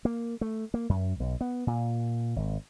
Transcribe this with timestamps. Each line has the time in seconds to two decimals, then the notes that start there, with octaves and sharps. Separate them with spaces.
0.05 A#3
0.41 A3
0.74 A#3
0.89 F#2
1.20 B1
1.41 B3
1.67 A#2
2.36 G#1